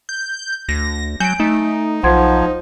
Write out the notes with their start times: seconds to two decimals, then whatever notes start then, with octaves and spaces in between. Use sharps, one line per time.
0.09 G6
0.69 D2 A#6
1.20 F#3 G#5 G6 D7
1.40 A3 D#4
2.04 B1 F3 F#5 C6 G#6